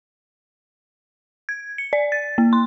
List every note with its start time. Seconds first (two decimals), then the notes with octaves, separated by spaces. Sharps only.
1.49 G#6
1.78 C#7
1.93 D5
2.12 A6
2.38 A#3
2.53 C6